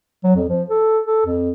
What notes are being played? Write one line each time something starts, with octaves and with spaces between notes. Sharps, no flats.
F#3
F2
F3
A4
A4
F2